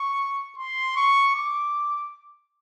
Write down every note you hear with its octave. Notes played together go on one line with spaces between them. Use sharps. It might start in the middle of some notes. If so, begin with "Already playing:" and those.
Already playing: C#6
C6
C#6
D6